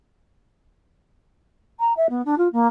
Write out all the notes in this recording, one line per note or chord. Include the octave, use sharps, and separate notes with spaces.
A#5
E5
B3
D4
F4
A#3